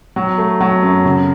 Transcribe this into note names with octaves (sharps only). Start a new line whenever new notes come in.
F#3
A3
F#3
F#2
C#3